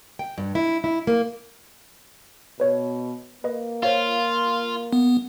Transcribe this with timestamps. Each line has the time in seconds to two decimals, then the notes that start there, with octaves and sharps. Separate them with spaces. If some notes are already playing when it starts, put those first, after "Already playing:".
0.19 G5
0.38 G2
0.55 E4
0.84 E4
1.07 A#3
2.60 B2 B4 C#5
3.44 A#3 B4 D#5
3.83 F4 C5 C#5 F5
4.93 B3